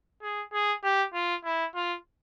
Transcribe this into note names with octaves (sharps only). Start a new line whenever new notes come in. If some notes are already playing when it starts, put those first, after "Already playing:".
G#4
G#4
G4
F4
E4
F4